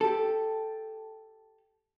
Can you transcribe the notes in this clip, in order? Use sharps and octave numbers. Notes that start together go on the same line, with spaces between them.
G4 A4